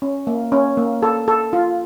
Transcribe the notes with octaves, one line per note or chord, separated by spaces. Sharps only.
C#4
A#3
C#4
A#3
A4
A4
F4